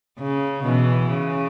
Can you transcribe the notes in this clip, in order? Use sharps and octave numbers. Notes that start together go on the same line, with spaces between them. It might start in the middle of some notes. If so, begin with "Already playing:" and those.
C#3
B2 E3
C#3